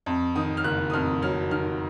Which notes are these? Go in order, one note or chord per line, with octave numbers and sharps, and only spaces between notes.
F2
D#3 D#6
F6
F#1 F#6
D#6
F2 F6
F#3 F6
D#3 F6